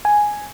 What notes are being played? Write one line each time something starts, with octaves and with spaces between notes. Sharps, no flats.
G#5